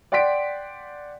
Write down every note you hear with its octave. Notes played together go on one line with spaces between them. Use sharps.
D5 F#5 G5 C6 B6 D7